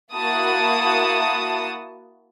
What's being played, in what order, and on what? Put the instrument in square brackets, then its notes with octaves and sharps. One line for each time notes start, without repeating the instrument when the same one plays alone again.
[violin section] A#3 E4 F#4 A5 D#6